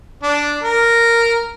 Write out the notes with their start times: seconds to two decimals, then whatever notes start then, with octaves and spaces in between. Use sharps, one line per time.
0.23 D4
0.63 A#4